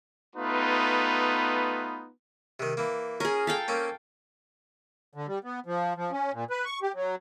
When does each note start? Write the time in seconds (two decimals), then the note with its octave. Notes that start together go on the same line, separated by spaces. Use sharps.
0.36 A3 B3 D#4 F4 B4
2.60 C3 D#3
2.77 E3 A#3
3.20 C#4 G#4 A#4
3.47 A4 F5 G5
3.68 A#3 C4 C#4
5.14 D3
5.28 G3
5.44 B3
5.66 F3
5.96 F3
6.12 C#4
6.33 A#2
6.50 B4
6.65 C#6
6.82 G4
6.95 F#3